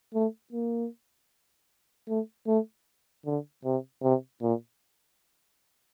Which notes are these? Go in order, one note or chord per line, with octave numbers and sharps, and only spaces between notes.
A3
A#3
A3
A3
D3
C3
C3
A#2